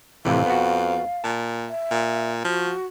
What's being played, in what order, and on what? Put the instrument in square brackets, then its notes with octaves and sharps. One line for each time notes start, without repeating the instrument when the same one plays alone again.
[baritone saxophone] F2 [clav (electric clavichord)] A2 C3 E3 [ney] F5
[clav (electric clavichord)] B3 F#4
[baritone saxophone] A#2 [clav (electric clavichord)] A5
[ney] E5
[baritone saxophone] A#2
[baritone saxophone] F3 [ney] F#4